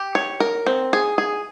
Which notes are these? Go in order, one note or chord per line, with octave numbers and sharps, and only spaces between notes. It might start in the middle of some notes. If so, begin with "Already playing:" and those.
Already playing: G4
C#5
A#4
C4
G#4
G#4